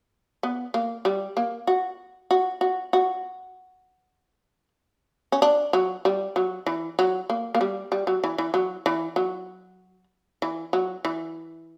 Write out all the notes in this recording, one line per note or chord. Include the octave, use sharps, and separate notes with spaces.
B3
A#3
G3
A#3
F#4
F#4
F#4
F#4
C#4
D4
F#3
G3
F#3
E3
F#3
A#3
A#3
G3
G3
F#3
E3
E3
F#3
E3
F#3
E3
F#3
E3